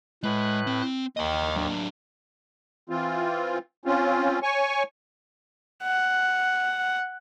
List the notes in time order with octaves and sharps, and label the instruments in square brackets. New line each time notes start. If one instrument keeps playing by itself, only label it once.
[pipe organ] A2 B4 F#6 [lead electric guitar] G#3
[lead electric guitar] C4
[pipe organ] D#2 [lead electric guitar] D#5 G5
[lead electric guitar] F#3 D4
[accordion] E3 C4 F4
C4 C#4 F4
C#5 G#5 C#6
[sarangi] F#5